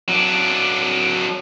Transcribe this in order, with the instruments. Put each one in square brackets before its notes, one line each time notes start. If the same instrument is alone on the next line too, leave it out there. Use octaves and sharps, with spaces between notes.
[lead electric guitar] F#3 D4